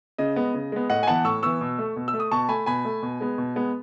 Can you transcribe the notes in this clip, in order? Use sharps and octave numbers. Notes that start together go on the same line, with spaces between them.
C#3 D#5
G#3 B3
C#3
G#3 B3
A2 D#5 F#5
G#5
E3 B3 F#5 A5
A2 C#6 E6
E3 B3 C#6 E6
B2
A3
B2
E6
A3
D#6
B2 A5 C#6
A3 G#5 B5
B2 G#5 B5
A3
B2
G#3 B3
B2
G#3 B3